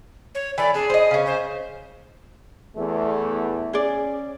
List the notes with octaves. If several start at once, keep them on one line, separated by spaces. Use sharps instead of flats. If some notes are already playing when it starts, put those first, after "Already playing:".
C#5
E3 A4 D5
D4 G#4
C5 D#5
C#3 C#4
C5
E2 A3
C#4 G#4 D5